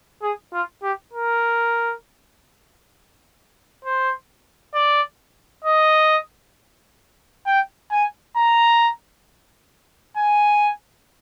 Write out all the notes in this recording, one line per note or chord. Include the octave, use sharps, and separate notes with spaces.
G#4
F4
G4
A#4
C5
D5
D#5
G5
G#5
A#5
G#5